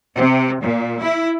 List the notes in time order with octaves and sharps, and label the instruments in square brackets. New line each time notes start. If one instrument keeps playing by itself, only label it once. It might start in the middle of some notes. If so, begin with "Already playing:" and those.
[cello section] C3
A#2
E4